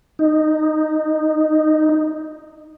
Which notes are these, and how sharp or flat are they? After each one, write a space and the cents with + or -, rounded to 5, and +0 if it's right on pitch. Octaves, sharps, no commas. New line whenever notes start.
D#4 -10